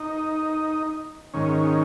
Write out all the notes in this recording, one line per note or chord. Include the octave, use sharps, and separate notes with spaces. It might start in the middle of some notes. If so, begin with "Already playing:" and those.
Already playing: D#4
G#2 D#3 C#4